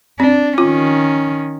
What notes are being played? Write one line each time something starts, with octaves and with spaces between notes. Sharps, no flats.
C4 D4
D#3 C#4 F4